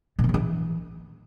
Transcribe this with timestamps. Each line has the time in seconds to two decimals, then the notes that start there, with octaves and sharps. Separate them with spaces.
0.19 A#2
0.24 E3
0.29 A2
0.34 E3